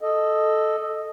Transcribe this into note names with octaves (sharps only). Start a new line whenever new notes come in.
A4 D#5